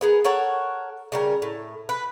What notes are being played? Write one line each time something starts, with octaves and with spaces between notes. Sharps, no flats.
B3 G#4 A#4
A4 A#4 C#5 F#5
C#3 G3 A#4
A2
B4